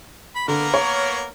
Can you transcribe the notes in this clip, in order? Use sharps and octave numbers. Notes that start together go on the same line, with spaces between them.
B5
D3 A#3 B3 A#4
C#5